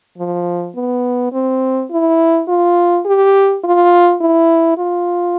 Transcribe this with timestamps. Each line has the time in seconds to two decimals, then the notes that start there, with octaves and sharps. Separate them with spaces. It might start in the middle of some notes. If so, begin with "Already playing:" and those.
0.18 F3
0.76 B3
1.33 C4
1.91 E4
2.48 F4
3.06 G4
3.64 F4
4.21 E4
4.78 F4